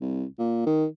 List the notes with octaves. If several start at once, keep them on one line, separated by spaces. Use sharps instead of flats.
C2
A#2
D#3